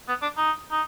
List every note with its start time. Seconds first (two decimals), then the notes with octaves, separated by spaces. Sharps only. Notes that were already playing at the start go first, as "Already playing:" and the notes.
0.08 B3
0.22 D4
0.37 D#4
0.71 D#4